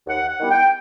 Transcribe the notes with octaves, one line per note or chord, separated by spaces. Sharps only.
D#2 F#5
F#5
D#3 G3 B3 E4
G5